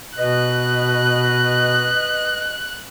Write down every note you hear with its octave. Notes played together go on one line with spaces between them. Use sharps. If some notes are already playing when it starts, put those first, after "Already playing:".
B2 B4 D#5 F#6